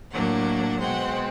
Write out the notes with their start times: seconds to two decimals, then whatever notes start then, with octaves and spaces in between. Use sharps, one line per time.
0.11 A2 F#3 A#3 D4 F#5
0.80 B2 G#3 C4 F#5